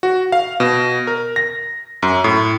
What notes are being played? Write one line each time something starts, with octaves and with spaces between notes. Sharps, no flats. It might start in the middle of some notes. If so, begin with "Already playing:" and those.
F#4
F5
B2
A#4
A#6
F#2
A2